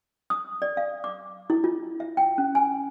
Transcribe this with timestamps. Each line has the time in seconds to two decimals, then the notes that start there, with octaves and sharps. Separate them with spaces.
0.30 D#6
0.62 D5
0.77 F5
1.04 D6
1.50 E4
1.64 F4
2.00 E5
2.17 G5
2.38 C#4
2.55 G#5